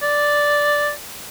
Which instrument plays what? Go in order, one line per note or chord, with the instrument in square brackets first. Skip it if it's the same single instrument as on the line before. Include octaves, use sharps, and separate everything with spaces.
[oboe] D5